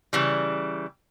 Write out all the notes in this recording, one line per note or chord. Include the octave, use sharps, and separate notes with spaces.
C#3 E3 G3